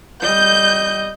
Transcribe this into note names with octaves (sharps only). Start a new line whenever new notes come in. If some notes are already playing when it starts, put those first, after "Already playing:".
G3 D#5 G6